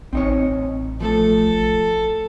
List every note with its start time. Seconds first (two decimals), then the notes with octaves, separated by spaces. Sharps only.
0.13 A1 C4 D#4 C#5
1.00 F3 A3 A4